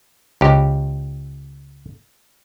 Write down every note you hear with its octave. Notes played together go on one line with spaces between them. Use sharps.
C#2 G4